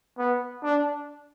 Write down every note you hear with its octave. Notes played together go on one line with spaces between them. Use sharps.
B3
D4